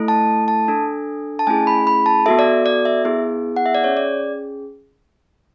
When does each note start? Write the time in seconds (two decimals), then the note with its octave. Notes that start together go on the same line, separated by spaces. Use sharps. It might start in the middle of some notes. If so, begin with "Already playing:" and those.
Already playing: A3 E4 A4
0.08 A5
0.48 A5
0.68 D4 A4
1.39 A5
1.47 A3 C#4 E4 G#4 G#5
1.67 B5
1.87 B5
2.06 A5
2.26 B3 F#4 A4 E5
2.39 D5
2.66 D5
2.85 E5
3.05 B3 E4 G#4
3.56 F#5
3.66 E5
3.75 D5
3.84 C#4 G#4 C#5
3.97 D5